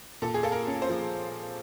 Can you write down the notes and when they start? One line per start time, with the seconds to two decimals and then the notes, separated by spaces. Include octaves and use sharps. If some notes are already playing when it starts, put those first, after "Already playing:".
0.22 A#2 A4
0.34 G#4
0.43 A#3 A4
0.52 A#4
0.67 C#4
0.82 C5
0.90 F3